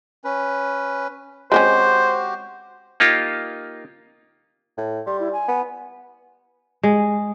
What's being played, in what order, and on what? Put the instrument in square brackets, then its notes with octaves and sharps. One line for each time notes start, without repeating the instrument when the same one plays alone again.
[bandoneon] C#4 B4
[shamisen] G#3 C4 C#4 [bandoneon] F#4 G4 [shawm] C5
[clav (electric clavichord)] A#3 D#4 F4 G4
[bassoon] A2
[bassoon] G3 [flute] C6
[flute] E4
G#5
[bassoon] B3
[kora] G#3